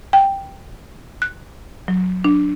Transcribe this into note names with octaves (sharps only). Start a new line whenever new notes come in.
G5
F#6
F#3
D4